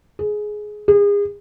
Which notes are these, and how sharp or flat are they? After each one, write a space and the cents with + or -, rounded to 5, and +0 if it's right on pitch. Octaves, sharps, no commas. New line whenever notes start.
G#4 +15
G#4 -35